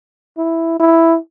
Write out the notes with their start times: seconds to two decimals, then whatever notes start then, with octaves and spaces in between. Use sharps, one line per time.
0.38 E4
0.80 E4